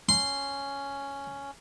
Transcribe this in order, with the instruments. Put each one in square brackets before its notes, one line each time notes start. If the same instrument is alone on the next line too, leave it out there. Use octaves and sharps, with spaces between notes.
[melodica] C#4 [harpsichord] C6